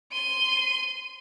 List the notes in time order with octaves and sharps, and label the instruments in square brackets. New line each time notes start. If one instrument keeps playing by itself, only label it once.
[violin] C6 D#7